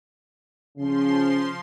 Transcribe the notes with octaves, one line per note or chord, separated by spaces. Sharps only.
C#3 F3 C6